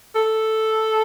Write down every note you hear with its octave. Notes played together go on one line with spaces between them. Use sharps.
A4